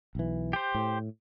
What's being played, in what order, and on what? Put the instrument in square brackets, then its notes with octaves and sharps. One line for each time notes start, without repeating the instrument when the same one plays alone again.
[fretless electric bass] B1 E3
[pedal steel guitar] G4 C5
[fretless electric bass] A2